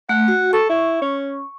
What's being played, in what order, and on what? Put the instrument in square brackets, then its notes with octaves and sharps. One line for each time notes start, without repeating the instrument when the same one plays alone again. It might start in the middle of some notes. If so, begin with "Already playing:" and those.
[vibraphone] A3 [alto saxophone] F#5
[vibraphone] F#4
[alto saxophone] A4 [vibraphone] C#6
[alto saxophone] E4
C#4